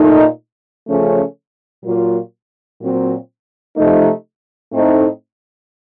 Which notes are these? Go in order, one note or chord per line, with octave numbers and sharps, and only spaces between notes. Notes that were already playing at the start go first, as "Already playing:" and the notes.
Already playing: A#2 A3 D#4
C#3 F3 A3 C#4
A#2 F#3 A#3 F4
A#2 F#3 C4
C3 F3 A3 D#4
A2 A3 C4 D#4